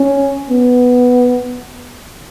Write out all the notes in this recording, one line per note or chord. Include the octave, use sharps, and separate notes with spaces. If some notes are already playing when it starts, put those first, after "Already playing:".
Already playing: C#4
B3